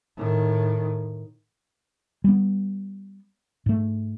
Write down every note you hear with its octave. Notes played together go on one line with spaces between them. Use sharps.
A2 D#3
G3 B3
G#2 A3